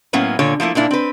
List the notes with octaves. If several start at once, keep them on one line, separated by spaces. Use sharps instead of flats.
A2 F#3 A#3 B3 C#4
A#2 D3 C#5
F3 A3 A#3 E4
A#2 A#3 D4 E4
C4 B4